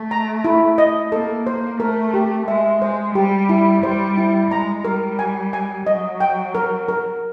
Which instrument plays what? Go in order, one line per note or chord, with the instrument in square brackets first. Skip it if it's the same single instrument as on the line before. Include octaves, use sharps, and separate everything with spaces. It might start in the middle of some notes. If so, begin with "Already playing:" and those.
Already playing: [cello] A3
[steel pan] A#5
E4
D#5
[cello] A#3 [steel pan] A4
[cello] A#3 [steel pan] C5
[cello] A3 [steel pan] A#4
[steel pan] G4
[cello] G#3 [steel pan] E5
[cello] G#3 [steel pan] C5
[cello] G3 [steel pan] G4
[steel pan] E4
[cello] G3 [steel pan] C5
[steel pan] E4
[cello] G#3 [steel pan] A#5
[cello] G3 [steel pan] A#4
[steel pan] G#5
G#5
[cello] F#3 [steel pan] D#5
[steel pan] G5
A#4
A#4